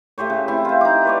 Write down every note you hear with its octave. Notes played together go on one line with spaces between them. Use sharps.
A3 G4 C5 C#5
C#3
A3 C4 E4 E5
F4 C5
D#4 D6
B4 C#5 D5